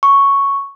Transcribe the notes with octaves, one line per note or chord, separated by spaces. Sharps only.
C#6